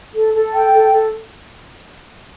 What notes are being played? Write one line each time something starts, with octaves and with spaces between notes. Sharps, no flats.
A4
A4
G5
A4
A4